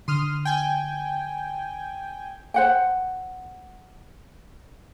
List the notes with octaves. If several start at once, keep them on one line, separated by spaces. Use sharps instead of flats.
D3 C6 D#6 F6
G5 G#5
C5 F#5 G5